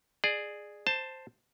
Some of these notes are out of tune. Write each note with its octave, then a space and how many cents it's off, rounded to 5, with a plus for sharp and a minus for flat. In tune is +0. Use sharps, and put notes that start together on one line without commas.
G#4 +0 D5 +25
C5 +0 A5 +10